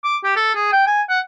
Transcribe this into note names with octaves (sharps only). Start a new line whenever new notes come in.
D6
G4
A4
G#4
G5
G#5
F#5